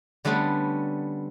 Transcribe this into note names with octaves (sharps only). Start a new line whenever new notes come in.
D3 G3 A3 B3 C#4